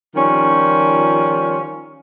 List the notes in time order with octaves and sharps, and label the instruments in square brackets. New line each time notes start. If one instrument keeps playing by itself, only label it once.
[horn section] D#3 F3 G3 C#4 F4